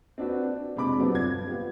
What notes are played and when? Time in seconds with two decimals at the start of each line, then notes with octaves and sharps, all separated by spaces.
0.18 C4 D4 F#4 B4
0.43 D4
0.76 F2 C3 G#3 D4 B5 D6
0.98 F3 F#3 B3 C4 D4
1.15 G1 G#6
1.47 B3 F4 G4